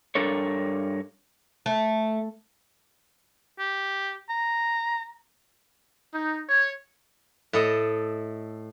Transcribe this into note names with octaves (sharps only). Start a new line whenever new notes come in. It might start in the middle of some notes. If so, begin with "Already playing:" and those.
G2 D4 A4 A#4 C#5
A3
G4
A#5
D#4
C#5
A2 A4 D#5